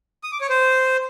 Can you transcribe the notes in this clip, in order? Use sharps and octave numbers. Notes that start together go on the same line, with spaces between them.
D#6
D6
C#5
C5